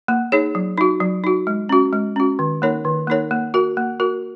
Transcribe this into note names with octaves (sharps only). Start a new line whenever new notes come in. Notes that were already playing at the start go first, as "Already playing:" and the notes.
A#3
D#4 G#4 C#5
F#3
D#4 F#4
F#3
D#4 F#4
G#3
C#4 F#4
G#3
C#4 F#4
D#3
A#3 D#4 A#4 C#5
D#3
A#3 D#4 A#4 C#5
A#3
F#4 A#4
A#3
F#4 A#4